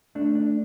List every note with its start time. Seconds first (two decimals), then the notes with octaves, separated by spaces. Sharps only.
0.15 A3 D4
0.35 D4